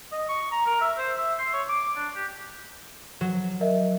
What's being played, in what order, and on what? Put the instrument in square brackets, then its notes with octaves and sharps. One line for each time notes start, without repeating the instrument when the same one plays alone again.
[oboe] D#5
C#6
A#5
A#4
E5
C5
E5
C6
C#5
D6
D4
G4
[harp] F#3
[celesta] A#4 D#5 E5